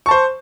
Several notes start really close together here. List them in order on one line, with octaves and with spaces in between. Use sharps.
C#6 A5 C5